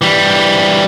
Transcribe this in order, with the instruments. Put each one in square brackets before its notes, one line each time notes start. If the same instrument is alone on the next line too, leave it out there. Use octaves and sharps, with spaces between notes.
[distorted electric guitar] E3 G3